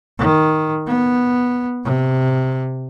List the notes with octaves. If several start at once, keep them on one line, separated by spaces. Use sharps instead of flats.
D#3
B3
C3